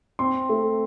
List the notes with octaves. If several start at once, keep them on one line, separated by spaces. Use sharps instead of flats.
C4 C6
A3